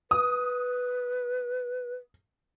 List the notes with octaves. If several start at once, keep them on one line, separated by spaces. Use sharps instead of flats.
B4 D#6